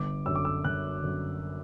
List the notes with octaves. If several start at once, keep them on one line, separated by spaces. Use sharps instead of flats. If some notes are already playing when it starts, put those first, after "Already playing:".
Already playing: G1 D6
F#2 D3 E6
D6
E6
G1 F#6
F#2 D3